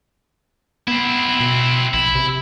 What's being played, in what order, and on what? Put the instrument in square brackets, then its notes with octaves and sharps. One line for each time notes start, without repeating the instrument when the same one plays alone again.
[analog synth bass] B3 [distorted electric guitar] C4 E4
[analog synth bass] B2
[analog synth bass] A#1 [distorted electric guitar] E4
[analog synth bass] C3